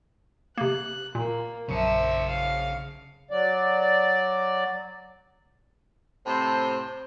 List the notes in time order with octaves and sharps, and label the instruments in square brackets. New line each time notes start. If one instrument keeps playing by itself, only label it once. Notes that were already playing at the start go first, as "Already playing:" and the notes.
[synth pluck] C3 A#3 [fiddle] F#6
[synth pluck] A#2 [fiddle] A#3
[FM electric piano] A#1 F#2 C#7 [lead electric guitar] C#3 A5 [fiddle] C5 E5
[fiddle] F5
[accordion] F#3 D5
[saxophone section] A2 C3 C5